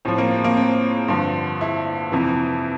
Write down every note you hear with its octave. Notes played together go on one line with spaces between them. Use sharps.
A2 F3 C4
A#3
C4
A#3
C4
G2 D3 F3
E4
F2 C3 E3